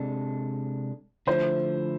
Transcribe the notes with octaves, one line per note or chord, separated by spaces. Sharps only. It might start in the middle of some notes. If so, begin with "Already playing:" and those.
Already playing: C3 G#3 D4 A4
D3 F3 A3 E4 C5